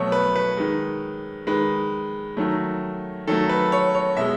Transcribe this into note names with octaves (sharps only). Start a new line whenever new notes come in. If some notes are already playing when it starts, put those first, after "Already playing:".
Already playing: B2 F#3 A3 C#5
B4
B4
D#3 G#3
D#3 G#3 B4
D#3 F#3 A3
D#3 F#3 A3 A4
B4
C#5
C#5
B2 G#3 E5